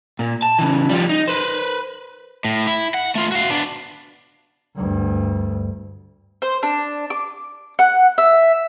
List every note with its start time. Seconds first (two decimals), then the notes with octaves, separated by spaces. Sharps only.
0.19 A#2
0.42 A5
0.59 C#3 E3
0.89 F3 G3
1.09 D#4
1.28 B4 C5
2.45 A2
2.67 E4
2.94 F#5
3.15 A3 F4
3.32 F#4 F5
3.50 B3 D4
4.76 D2 G2
6.42 C5
6.63 D4
7.10 D6
7.79 F#5
8.18 E5